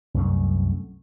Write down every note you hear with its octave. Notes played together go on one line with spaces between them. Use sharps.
C2 F#2 A3